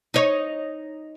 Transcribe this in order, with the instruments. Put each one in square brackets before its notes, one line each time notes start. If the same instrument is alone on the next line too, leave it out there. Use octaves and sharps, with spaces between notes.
[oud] D#4 C#5